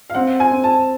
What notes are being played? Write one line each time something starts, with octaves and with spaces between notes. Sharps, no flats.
F5
C4 F#5
G#5
C4
A5